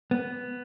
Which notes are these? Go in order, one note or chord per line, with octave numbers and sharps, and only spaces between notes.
B3